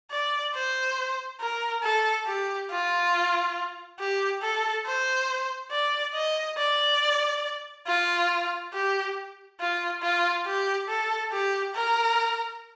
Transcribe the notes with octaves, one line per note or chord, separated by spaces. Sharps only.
D5
C5
A#4
A4
G4
F4
G4
A4
C5
D5
D#5
D5
F4
G4
F4
F4
G4
A4
G4
A#4